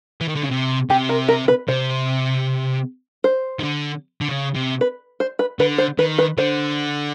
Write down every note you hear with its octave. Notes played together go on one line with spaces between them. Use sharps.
E3
D#3
D3
C#3
C3
C3 G4
A#4
A#4
B4
C3 C5
C5
D#3
D3
D3
C#3
C3
B4
C5
B4
D3 B4
C5
D#3 B4
B4
D3 C5